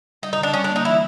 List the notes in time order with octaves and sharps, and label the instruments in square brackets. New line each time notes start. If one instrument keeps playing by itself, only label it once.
[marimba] G3 [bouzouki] D#4
[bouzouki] D#4
[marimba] D3
[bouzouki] D4
[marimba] G3 [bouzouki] C#4
[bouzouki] D4
[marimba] A#3
[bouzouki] D#4
[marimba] E3 [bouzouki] E4